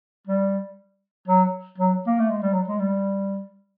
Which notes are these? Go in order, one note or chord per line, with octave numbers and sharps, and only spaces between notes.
G3
F#3
F#3
A#3
A3
G#3
G3
F#3
G#3
G3